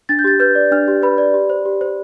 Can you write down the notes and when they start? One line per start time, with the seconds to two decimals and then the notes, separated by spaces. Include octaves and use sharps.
0.09 D4 A6
0.19 G6
0.24 G4 A6
0.40 B4 G6
0.55 D5
0.71 D4 F6
0.88 G4
1.03 B4 B5
1.18 D5
1.34 G4
1.50 C5
1.65 G4
1.81 C5